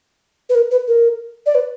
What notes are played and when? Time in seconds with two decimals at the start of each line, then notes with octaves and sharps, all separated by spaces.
0.49 B4
0.55 A#4
0.71 B4
0.88 A#4
1.46 D5
1.55 B4